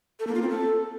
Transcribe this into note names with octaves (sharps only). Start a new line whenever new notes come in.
A4
A#3
F4
C4
A4